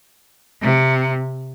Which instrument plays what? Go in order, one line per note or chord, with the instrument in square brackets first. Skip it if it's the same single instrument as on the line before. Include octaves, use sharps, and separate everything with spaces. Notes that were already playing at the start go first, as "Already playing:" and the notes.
[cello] C3